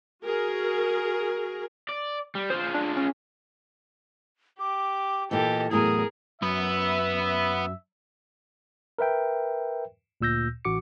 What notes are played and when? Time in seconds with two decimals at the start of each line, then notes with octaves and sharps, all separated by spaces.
0.24 F#4 G#4 A#4
1.89 D5
2.35 G3
2.50 F4 G#4 C5
2.74 D4
2.97 C#4
4.60 G4 D6
5.31 A#2 E3 G4 A4 D#5
5.71 E2 A2 F#3 G#4 A#4 D#6
6.42 F#2 B3 B4 E5
8.99 A#4 B4 E5 G5
10.21 D2 A#2 E6 G6 A#6
10.65 A1 F#4 D6 C#7